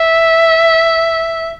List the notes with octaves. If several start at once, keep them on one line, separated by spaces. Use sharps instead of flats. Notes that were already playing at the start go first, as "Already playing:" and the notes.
Already playing: E5